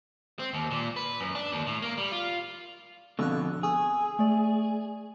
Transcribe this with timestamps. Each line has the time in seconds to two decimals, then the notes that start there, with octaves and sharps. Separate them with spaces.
0.39 C4
0.53 D#2
0.71 A#2
0.96 B4
1.20 F#2
1.35 D4
1.52 D#2
1.67 A2
1.82 A#3
1.97 G3
2.12 F4
3.19 F2 B2 D3 C#6 E6 F#6
3.63 G#4 C#6 D#6 E6
4.19 A3 D5